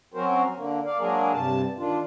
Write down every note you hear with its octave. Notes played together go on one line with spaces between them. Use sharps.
F#3 C4 C#4 F#4 A#4 C5
D3 A#3
D5 F5
F#3 G#3 A#3 D4 G#4 A#4
G2 C3 A5
D#3 D4 F4